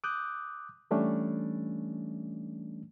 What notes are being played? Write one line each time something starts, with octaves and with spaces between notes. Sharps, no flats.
D6 D#6 F#6 G6
E3 G3 A3 C#4 D4